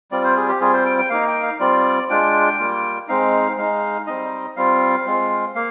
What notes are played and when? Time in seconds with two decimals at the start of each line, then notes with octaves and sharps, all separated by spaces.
0.12 G3 C4 F4 D5
0.24 C5
0.36 G#4
0.48 G4
0.61 G3 C4 F4 G#4
0.73 C5
0.86 G5
0.98 G5
1.10 A#3 D#4 F5
1.27 G5
1.43 F5
1.60 G3 C4 F4 D5
2.10 G#3 D4 F4 G5
2.59 G3 A#3 F4
3.08 G#3 C4 D#4 F5
3.58 G#3 D#4 F5
4.07 G3 C4 D#4 D#5
4.56 G3 C4 F4 F5
5.06 G#3 C4 F4
5.55 A#3 F5